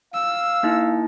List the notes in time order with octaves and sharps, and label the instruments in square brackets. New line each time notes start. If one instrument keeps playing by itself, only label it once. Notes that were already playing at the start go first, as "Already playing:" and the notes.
[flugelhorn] F5 [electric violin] E6
[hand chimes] A#3 D#4 E4